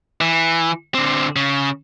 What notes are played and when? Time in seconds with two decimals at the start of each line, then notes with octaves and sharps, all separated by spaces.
0.21 E3
0.95 D3 C4
1.36 C#3